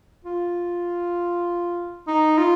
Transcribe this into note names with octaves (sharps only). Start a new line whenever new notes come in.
F4
D#4
F4